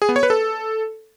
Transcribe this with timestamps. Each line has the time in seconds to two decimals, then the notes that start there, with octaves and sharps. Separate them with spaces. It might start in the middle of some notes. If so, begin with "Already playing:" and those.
0.02 G#4
0.09 B3
0.16 C#5
0.23 B4
0.30 A4